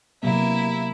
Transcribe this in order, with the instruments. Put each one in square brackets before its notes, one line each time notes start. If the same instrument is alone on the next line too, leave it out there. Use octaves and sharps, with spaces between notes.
[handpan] C3 F#3 B3 [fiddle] A#3 E4